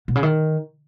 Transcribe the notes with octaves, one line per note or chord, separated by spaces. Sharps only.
B2
C#3
D#3